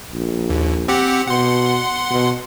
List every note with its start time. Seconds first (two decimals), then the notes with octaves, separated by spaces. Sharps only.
0.12 A#1
0.50 D#2
0.88 C4 G4 F#5
1.28 B2 F#5 C6
2.12 B2